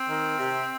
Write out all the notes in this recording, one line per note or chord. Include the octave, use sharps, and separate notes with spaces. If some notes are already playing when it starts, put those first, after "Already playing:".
Already playing: C4
D#3
C3